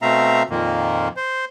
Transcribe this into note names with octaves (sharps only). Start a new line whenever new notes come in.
B2 A3 C4 E5 F5 A#5
F2 A#2 D#3 A#3
C5